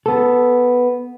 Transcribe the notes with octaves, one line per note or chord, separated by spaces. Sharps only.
B3 A4